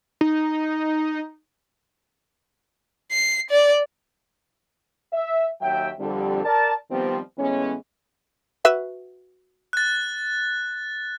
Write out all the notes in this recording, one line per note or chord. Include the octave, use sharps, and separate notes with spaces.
D#4
C7
D5
E5
D#2 F#3 E5 G5
F2 D3 G3
A#4 D5 A5
D#3 F3 G3 B3 C4
A2 E3 G#3 B3 C#4
F#4 B4 E5
F#6 A6